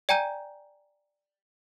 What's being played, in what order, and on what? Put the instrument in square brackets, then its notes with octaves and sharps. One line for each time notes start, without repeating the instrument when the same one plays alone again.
[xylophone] D5 G5 G#5 A#5 G6 D#7